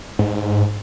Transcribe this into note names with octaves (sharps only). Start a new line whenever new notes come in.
G#2